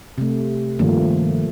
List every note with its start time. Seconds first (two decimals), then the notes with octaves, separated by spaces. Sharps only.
0.18 C3 A3
0.79 G2 D#3 F3 A3 A#3